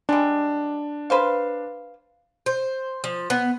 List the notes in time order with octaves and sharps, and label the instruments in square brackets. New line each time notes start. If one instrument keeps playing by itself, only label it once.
[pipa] G3 G#3 [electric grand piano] D4
[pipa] B4 C5 F5
[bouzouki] C5
F3
B3